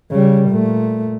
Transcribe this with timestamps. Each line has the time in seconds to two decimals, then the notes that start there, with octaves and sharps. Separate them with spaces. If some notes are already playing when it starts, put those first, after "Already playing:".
0.11 C#3 G3
0.50 A#2 A3